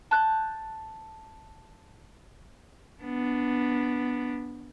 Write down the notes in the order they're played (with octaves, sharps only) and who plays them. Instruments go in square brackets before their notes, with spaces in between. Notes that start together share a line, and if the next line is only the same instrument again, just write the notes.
[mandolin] A5 F#6 G6
[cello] B3 D4